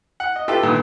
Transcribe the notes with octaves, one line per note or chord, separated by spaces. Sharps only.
F#5
D#5
F4 G4 A4 B4 E5 G5
G2 A#2 D3 D#3 A#3 B3